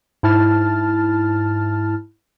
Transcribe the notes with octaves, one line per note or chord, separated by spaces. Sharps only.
G#2 E4 A5 F6 A6